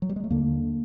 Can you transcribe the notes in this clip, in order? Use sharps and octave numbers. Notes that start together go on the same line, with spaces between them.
F#3
G3
G#3
A3
D#2 D3 A#3